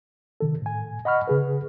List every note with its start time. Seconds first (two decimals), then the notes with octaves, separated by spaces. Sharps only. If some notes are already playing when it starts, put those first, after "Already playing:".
0.40 C3 D#3 A4
0.62 A2 G#5
1.05 D#5 F#5 B5 C#6 F6
1.27 C#3 G#4 B4